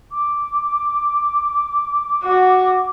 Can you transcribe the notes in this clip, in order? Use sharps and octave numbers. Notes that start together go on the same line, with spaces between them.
D6
F#4